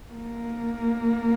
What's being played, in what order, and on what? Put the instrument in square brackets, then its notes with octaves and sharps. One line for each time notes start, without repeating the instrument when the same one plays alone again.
[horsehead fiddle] A#3